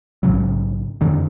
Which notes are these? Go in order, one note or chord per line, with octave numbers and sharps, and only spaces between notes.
A#1 G#2 C#3 F#3
F2 D3 D#3